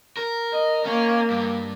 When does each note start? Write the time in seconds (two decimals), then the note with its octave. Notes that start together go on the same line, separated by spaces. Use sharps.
0.17 A#4
0.53 D#5
0.86 A#3 C#4
1.30 G2